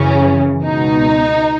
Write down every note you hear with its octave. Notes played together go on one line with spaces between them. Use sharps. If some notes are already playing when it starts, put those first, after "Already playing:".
Already playing: F#2 C#3 E3 C#4
C#2 B2 D#4